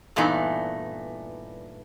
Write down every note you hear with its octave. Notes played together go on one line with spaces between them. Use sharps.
G2 A#2 E3 A3 B3 D#4